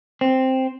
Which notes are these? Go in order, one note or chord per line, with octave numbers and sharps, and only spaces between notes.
C4